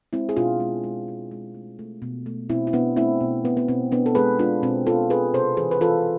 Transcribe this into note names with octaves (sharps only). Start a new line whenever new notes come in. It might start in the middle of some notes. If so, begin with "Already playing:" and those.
G#3 C4 E4
G#4
B2 D4 F4
G#3
G#3
G#3
G#3
A3
A3
B2
A3
B2 C4 E4
E4
B2 B3 D4
A3 C4 E4
B2
B2 B3
B3
B2 C4
B2 B3 D4
A4
G#3 G#4 B4
G#3 D4 F4
B2 C4
G#3 F4 A4
G#3 G#4 B4
C3 A4 C5
E3 G#4 B4
B4
E3 F4 A4